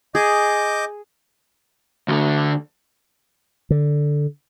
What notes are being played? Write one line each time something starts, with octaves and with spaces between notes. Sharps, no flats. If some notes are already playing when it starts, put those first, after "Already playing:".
G#4 D#5 D6 G6
D2 D3
D3